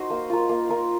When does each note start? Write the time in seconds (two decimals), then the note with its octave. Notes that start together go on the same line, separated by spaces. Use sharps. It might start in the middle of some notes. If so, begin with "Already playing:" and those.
Already playing: D#4 F#4 C5 D#5
0.10 A#3
0.30 F4 A#4
0.49 A#3
0.69 F4 A#4